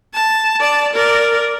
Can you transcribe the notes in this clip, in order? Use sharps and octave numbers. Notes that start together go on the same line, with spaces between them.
A5
D5 A5
A#4 D5